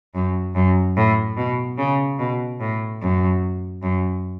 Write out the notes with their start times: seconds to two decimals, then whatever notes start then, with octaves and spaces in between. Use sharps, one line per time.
0.14 F#2
0.55 F#2
0.96 A2
1.37 B2
1.78 C#3
2.19 B2
2.60 A2
3.01 F#2
3.82 F#2